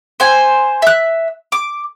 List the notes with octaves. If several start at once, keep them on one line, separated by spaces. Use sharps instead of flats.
C5 G#5
E5 F#6
D6